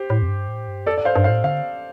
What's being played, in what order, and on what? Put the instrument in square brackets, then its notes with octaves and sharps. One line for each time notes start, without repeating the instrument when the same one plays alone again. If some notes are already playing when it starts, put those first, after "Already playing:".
Already playing: [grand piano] G4 C5
[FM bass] A2
F2
G2
A2
G2
[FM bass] F2 [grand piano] A4 D5
[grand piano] D5
C5 F5
[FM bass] G2
[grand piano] C5 F5
[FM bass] A2
[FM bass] D3 [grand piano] F5